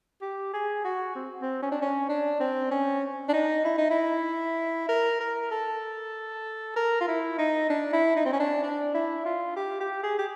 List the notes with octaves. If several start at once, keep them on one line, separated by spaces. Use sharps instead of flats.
G4
G#4
F#4
C4
C4
C#4
D4
C#4
D4
C4
C#4
D4
D#4
E4
D#4
E4
A#4
A#4
A4
A#4
F4
E4
D#4
D4
E4
D#4
C4
C#4
D4
D4
E4
F4
G4
G4
G#4
G4